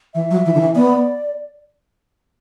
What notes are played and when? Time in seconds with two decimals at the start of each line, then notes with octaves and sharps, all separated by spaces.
0.15 E3 E5
0.31 F#3
0.46 E3
0.55 D3
0.60 E3
0.75 B3 D5